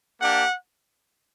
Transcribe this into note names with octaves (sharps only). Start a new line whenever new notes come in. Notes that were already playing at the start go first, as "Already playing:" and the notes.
A#3 D4 G4 F#5